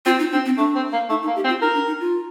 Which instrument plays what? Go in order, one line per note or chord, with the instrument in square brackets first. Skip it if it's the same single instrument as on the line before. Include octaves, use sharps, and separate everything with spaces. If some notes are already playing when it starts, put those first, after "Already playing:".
[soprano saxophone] C4 [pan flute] F4
[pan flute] D#4
[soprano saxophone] C4 [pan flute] D4
[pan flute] C4
[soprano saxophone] A3 [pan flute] D4
[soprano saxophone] C4
A#3
[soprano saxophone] A3 [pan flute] D#4
[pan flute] D#4
[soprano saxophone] A#3
[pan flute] G4
[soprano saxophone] C4
[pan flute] F4
[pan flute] D#4 [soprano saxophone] A#4
[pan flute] D4
D#4
F4